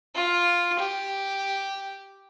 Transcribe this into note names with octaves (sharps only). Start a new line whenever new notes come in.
F4
G4